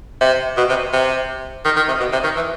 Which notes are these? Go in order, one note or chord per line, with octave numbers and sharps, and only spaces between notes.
C3
B2
C3
C3
D#3
D#3
C3
B2
C3
D#3
E3